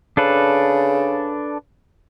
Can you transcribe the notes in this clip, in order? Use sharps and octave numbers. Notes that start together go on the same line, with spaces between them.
C#3 D4 A4 B4